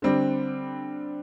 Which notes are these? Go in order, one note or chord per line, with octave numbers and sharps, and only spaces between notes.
D3 G3 C4